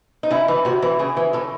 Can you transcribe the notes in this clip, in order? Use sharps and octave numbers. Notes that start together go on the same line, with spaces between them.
D#4
C#3 E4
E3
C3 F#4
E3 E4
C#3 G#4
E3
A2 A4